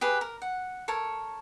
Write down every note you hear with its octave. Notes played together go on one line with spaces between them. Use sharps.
G4 G#4 B4
A#4
F#5
A4 A#4 C#5